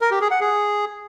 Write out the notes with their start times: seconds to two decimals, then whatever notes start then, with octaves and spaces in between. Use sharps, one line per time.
0.01 A#4
0.11 G4
0.21 G#4
0.31 F#5
0.41 G#4